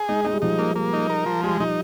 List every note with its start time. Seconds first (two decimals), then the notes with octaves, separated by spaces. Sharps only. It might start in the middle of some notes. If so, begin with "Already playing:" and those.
Already playing: G#4
0.09 G#3 D#4
0.25 G#3 D#4
0.33 G3
0.42 F3 D#4
0.59 A#3
0.76 G3 A#3
0.93 D#4
1.10 A#4
1.26 F3
1.43 G3 G#3
1.60 F3 D#4